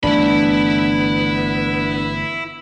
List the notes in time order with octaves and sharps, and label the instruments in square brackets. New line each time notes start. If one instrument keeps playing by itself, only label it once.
[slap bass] G1 E3 A3 [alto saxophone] B3 [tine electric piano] D4 [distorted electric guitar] E4 B5